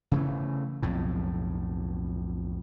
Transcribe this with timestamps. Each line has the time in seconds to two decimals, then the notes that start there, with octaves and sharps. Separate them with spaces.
0.12 C#3 E3 A3
0.82 B1 F2 A2